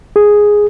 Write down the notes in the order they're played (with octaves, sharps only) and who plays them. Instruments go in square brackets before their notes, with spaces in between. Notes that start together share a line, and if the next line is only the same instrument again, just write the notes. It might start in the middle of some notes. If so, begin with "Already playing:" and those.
[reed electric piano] G#4